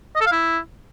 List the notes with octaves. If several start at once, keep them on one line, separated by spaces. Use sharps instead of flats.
D#5
A4
F5
E4